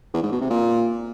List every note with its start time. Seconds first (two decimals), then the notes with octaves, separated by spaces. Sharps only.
0.14 E2
0.23 G#2
0.32 B2
0.41 C3
0.50 A#2